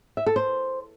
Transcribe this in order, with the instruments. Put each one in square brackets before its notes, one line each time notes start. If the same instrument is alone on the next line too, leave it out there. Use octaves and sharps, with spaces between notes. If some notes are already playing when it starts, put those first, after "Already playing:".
[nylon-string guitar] E5
A4
C5